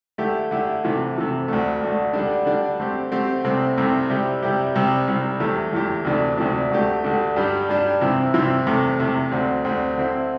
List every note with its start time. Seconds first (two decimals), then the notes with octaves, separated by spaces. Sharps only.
0.18 D3 A3 E4 G4
0.51 D3 A3 E4 G4
0.84 C3 E3 A3
1.16 C3 E3 A3
1.48 D2 D3 A3
1.81 D2 D3 A3
2.13 D3 G3 D4
2.46 D3 G3 D4
2.79 D3 A3 C4 G4
3.12 D3 A3 C4 G4
3.44 C2 C3 A3 C4
3.78 C2 C3 A3 C4
4.09 C3 G3 E4 G4
4.42 C3 G3 E4 G4
4.75 C2 C3 G3
5.07 C2 C3 G3
5.40 E2 E3 A3 E4 G4
5.73 E2 E3 A3 E4 G4
6.05 D2 C3 E3 A3 D4
6.38 D2 C3 E3 A3 D4
6.71 D2 D3 A3 D4 G4
7.04 D2 D3 A3 D4 G4
7.36 G2 G3 D4 G4
7.69 G2 G3 D4 G4
8.01 C2 C3 E3 C4 E4
8.34 C2 C3 E3 C4 E4
8.67 E2 C3 A3
8.99 E2 C3 A3
9.32 D2 D3 C4
9.65 D2 D3 C4
9.98 D3 C4 E4